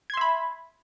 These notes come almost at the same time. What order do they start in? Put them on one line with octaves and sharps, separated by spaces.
G#6 C6 E5 B5